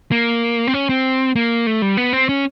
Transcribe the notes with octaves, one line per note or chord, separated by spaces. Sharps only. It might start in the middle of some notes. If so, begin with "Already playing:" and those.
A#3
C4
C#4
C4
A#3
A3
G3
B3
C4
C#4